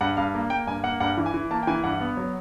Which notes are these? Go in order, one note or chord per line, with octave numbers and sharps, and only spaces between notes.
G2 F#5
G2 F5
A#3
A#3 G5
G2 G#5
A#3 F#5
G2 F#5
E3
G#5
E3
A#3 A5
G5
E3 G#5
G2 F#5
B3
F#3